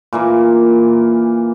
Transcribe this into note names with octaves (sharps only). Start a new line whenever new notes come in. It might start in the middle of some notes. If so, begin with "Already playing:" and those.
A#2 E3 A#3